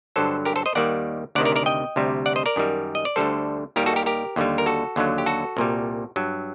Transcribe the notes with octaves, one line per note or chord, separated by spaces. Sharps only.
G2 D3 F#3 A4 C5
G4 A#4
A4 C5
C5 D#5
D#2 D#3 G3 D5 F#5
D2 C3 D#3 D5 F#5
A#4 D5
A#4 D5
D#5 G5
D2 C3 G3
D5 F#5
C5 D#5
A#4 D5
F#2 D#3 G3
D#5
D5
D2 D3 G3 A4 C5
D#2 D#3 G3 G4 A#4
F#4 A4
G4 A#4
G4 A#4
D#2 D3 G3
A#4
F#4 A4
D#2 D3 F#3
G4
F#4 A4
C2 A#2 G3
G2 F#3